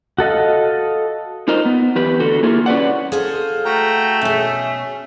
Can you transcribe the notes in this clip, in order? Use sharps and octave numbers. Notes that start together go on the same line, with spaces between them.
F#4 A4 D#5 F5
D#4 F4 A#4 C5 D#5
B3
E2 G4 B4
D3 F#4 A4
A#3 E4 F4 G#4 A#4
C#4 B4 D5 F#5
G#4 A4 C5 F5
A3 F#4 G5 A#5
B2 C#4 G#4 E5